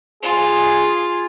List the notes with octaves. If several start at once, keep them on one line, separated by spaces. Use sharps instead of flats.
F4 G#4